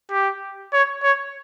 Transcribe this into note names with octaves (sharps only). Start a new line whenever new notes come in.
G4
C#5
C#5